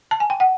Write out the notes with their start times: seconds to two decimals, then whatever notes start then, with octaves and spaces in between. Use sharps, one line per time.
0.11 A5
0.20 G#5
0.30 G5
0.40 F#5